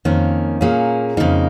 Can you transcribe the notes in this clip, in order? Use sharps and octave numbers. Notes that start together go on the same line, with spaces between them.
F2 D#3 A#3 C#4
A#2 A#3 C#4 G#4
F2 C#3 A#3 D#4